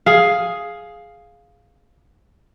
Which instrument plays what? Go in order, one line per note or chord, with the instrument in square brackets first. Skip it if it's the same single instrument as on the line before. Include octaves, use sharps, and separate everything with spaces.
[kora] G#4 F5